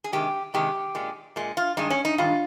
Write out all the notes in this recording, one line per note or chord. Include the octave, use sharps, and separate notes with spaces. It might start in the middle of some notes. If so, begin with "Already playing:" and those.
G#4
C3 D#3 G#3 G4
C3 D#3 G#3 G4
A#2 G#3
A#2 G#3
F4
G2 D#3 G#3 D#4
C#4
D#4
G2 D#3 G#3 F4